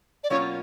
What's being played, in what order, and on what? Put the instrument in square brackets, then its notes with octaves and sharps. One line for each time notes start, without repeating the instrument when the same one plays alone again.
[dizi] D5
[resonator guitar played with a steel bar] B2 F#3 A#3 C#4 F4 [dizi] C#5